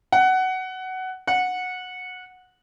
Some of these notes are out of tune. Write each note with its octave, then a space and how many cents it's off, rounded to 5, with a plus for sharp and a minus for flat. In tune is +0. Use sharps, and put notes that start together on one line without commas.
F#5 +15
F#5 -15